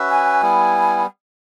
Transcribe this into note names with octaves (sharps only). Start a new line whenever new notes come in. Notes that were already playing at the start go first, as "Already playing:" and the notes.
Already playing: C#4 F#4 B4 E5
G#5
G3 B3 E4